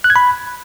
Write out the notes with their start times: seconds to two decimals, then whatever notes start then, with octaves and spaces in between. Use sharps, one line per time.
0.04 F#6
0.10 G#6
0.16 B5